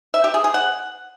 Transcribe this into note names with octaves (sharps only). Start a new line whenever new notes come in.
E5
G4
G#4
G#4
F#5